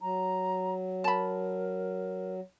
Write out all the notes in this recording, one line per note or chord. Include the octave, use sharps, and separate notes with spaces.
F#3 A#5
A#4 A5 B5